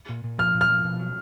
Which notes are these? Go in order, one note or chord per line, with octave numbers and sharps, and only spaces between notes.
A#2
A#2
F3 F6
A#2
F6
F3
B2
F#3